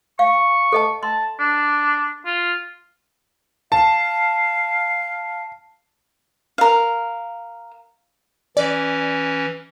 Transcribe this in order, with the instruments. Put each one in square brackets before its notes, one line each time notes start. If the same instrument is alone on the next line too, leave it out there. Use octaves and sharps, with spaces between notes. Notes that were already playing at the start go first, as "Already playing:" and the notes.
[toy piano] F5 [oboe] C#6
[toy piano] A4 D#5 A5
[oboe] A5 [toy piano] C6
[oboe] D4
F4
[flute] F5 [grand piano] A5
[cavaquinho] A#4 F5
[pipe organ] E3 C#4 [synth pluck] D5